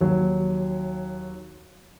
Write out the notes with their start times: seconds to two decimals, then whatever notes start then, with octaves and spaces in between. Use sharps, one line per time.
0.01 D#2 F#3